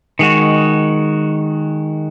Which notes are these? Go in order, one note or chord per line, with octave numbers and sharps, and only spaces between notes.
D#3 G#3 F#4